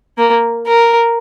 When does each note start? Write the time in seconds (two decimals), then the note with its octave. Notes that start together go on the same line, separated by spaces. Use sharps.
0.18 A#3
0.66 A#4